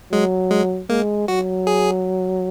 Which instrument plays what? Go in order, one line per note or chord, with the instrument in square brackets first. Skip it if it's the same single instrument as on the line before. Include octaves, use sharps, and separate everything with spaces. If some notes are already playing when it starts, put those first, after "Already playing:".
[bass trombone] F#3 [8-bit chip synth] G#3
[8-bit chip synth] G#3
[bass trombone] G#3 [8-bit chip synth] A#3
[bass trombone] F#3 [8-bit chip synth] F#4
[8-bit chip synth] G#4